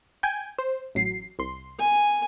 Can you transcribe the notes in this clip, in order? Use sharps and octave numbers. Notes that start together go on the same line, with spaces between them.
G5 G#5
C5
A1 F#3 C7
C2 C6
G#5